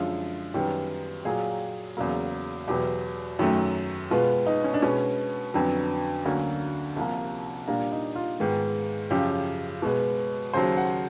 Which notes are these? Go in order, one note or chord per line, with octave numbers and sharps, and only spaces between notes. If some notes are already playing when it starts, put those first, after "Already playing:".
Already playing: F#2 D3 F3 G#3 F4
F#2 D#3 G3 B3
A#2 F#3 A#3 G#4
E2 C#3 F#3 A#3
E2 B2 F#3 B3 G4
F#2 D#3 F#3 A3
B2 G#3 B3 F4
D#4
C#4
D4
B2 G#3 B3 C#4
F2 D3 F#3 B3
D2 D3 F#3 A#3 C#4
C2 C3 F3 A#3
A#2 G3 A#3 D4
D#4
F4
G#2 D#3 G#3 B3
F#2 C#3 F3 G4
B2 G#3 B3
D#2 C#3 F#3 C5
F#5